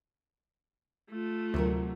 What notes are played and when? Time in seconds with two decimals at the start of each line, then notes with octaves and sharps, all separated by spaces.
1.11 A3 F4
1.54 D2 C3 F#3 A#4